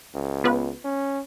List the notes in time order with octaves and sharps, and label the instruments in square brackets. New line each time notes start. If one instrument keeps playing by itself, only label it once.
[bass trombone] C#2
[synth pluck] B3 F4 B4
[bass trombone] C#4